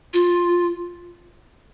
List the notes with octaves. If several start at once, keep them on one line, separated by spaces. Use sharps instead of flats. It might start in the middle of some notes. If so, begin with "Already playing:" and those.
F4